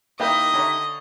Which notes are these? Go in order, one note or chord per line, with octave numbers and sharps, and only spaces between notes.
D#3 A#3 E4 G4 B4 D#5 E5
D3 C#5 A#5